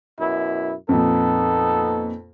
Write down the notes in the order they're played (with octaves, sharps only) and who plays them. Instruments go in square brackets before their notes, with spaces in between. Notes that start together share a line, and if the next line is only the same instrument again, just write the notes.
[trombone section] F#2 B2 E4
[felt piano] F2 A#2 [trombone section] B3 D#4 A4